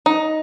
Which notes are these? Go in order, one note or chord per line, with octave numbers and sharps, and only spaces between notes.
D#4